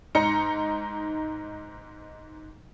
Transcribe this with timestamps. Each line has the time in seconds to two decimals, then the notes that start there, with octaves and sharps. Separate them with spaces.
0.15 G#2 D#4 A#5 C#7